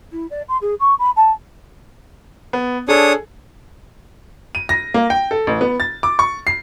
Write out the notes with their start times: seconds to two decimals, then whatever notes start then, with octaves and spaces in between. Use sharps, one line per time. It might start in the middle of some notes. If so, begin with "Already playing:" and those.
0.12 E4
0.31 D5
0.49 C6
0.62 G#4
0.80 C#6
0.99 B5
1.16 A5
2.53 B3
2.88 D4 G#4 A4 C#5 D#6
4.55 D#7
4.69 A#6
4.94 A#3
5.10 G5
5.31 A4
5.47 A1
5.61 B3
5.80 A6
6.03 D6
6.19 C#6
6.47 C7